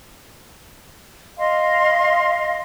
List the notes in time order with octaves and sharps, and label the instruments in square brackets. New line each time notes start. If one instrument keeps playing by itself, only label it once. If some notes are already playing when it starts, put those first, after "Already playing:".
[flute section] D#5 F5 C6